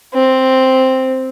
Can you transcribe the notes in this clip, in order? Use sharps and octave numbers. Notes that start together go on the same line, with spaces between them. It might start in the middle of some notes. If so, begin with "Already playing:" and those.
C4